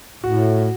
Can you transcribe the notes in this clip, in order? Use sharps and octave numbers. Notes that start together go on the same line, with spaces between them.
A2 F#4